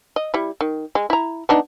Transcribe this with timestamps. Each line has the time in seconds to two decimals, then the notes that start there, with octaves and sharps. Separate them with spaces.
0.16 D#5
0.34 G3 E4
0.61 D#3
0.95 G#3
1.10 E4 A#5
1.49 B3 D4 D#4